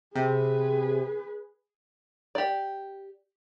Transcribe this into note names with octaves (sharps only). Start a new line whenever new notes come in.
C3 G#4 B4
G4 D5